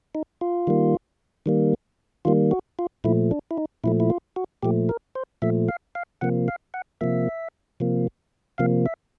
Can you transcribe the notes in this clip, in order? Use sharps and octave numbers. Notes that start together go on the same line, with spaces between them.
D#4
F4
D#3 G3 A#3
D#3 G3 A#3
D#3 G3 A#3 F4
F#4
F4
A#2 F3 A3 E4
D4
E4
D#4
A#2 F3 A3 E4
E4
F4
F#4
A#2 F3 A3 G4
A#4
C5
A#2 F3 A3 E5
F5
F5
C3 F3 A#3 F#5
F5
F#5
C3 F3 A#3 E5
C3 F3 A#3
C3 F3 A#3 F5
E5